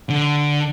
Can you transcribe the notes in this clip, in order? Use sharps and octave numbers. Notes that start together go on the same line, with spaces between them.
D3